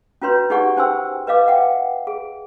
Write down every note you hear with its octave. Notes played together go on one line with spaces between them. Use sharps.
C#4 F4 F#4 B4 C#5 C6
D#4 G4 G#4 D5 F#5 C#6
C#4 C5 G5 G#5 C6 E6
B4 D#5 F5 D6
E5 F#5 G5
G#4